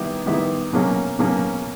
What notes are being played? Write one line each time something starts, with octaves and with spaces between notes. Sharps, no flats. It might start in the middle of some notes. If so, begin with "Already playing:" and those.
Already playing: D#3 G3 B3 E4
D#3 G3 B3 E4
B2 F#3 A#3 C#4
B2 F#3 A#3 C#4